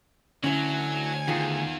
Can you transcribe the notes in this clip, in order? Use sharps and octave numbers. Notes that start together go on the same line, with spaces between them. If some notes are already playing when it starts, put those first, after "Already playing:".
D2 F#3 C#4 E4 G#5
E2 D#3 F4 G#4